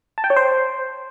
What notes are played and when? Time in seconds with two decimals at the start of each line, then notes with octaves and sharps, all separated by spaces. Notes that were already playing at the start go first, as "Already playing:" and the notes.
0.18 A5
0.24 G5
0.30 C#5
0.36 C5